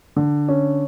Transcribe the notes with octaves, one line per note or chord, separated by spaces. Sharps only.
D3
C#4